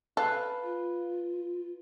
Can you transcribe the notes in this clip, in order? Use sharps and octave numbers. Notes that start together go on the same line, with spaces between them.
A4 B4 F5
F4